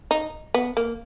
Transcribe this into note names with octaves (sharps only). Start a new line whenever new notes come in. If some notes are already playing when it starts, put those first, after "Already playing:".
D#4
B3
A#3